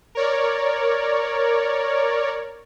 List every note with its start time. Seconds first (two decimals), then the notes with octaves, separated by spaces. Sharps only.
0.15 A#4 C#5 D5